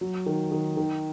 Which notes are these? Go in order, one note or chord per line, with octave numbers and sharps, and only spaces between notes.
F#3
D#3
D#3
D#3